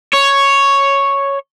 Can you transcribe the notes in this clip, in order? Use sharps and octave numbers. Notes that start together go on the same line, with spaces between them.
C#5